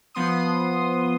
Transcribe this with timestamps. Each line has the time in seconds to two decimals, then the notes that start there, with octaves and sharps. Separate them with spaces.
0.15 F3 B3 C6 D#6